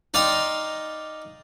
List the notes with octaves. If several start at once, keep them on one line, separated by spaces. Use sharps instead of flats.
D#4 D5 F5 G5 A#5 C6